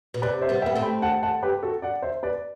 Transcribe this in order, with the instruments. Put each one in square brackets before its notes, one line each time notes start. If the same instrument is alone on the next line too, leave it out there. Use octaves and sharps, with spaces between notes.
[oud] B2
[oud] C3 [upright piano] B4 D5
[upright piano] C5 E5
[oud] G3 B3
[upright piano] E5 G5
[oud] B3
A3 C4
[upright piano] G5 B5
F#5 A5
F#5 A5
G4 B4
F#4 A4
D5 F#5
C5 E5
B4 D5